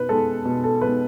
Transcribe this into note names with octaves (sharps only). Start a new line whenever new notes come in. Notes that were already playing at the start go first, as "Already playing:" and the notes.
Already playing: B2 B4
G#3 B3 A4
B2
A4
G#3 B3 B4